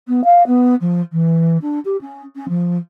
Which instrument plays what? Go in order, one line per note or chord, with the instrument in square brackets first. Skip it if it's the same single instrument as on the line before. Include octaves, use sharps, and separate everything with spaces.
[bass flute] B3
F5
B3
F3
E3
D4
G4
C#4
C#4
F3